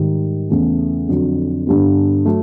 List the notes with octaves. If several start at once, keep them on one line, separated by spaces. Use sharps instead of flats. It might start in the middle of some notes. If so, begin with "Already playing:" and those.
Already playing: G#2 D#3 G3
E2 C#3 E3 A3 C#4
F2 D3 F#3
G2 D3 G3 B3
F#3 A3